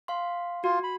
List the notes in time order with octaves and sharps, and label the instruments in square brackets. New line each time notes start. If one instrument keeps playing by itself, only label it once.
[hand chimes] F5 C6
[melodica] F4 [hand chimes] F#4
[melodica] B5